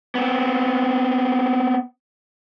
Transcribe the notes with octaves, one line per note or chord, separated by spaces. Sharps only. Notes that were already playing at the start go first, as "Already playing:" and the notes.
B3 C4